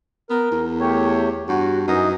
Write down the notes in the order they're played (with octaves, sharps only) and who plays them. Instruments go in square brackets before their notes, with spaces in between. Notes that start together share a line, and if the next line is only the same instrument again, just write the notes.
[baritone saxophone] B3 [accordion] A#4
[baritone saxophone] E2
[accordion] A3 G4 C#5
[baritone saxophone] G2 [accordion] F#4
[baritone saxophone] F#2 [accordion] E3 D#4 D#5